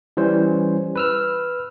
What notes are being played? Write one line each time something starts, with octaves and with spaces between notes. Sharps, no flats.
E3 G3 C#4 C5
B4 E6 F6